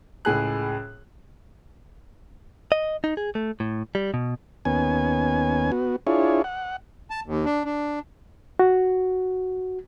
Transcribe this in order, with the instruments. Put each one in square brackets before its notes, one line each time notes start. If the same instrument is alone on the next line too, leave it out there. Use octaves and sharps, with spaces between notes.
[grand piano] C#2 A2 G#4 F#6
[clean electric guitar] D#5
D#4
G#4
A3
A2
G3
B2
[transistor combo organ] D#2 B3 C#4 G#5
B3 F#4
D4 E4 F4 G#4 C#5
F#5
[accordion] A5
D#2
D4
D4
[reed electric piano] F#4